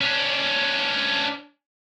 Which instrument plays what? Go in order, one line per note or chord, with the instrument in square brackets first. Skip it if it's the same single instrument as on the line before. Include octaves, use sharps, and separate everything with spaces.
[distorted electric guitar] C#4 D4